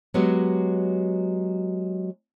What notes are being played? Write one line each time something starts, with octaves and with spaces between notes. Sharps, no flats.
F#3 G#3 B3 F#4 G4